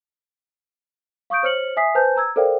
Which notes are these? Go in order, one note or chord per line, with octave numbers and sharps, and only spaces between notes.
F5 C#6 D#6 G6 D7
C5 C#5 F6 C#7 F#7
E5 G#5 D#6 B6 C7
B4 C5 G#5 A5 G6
A#5 E6 G#6
A4 A#4 C5 D5 F5 G5